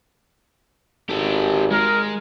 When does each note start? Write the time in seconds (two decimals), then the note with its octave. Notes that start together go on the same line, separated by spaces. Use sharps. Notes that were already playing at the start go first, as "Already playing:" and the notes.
1.10 G#1 G4 A4
1.72 G#3 A#4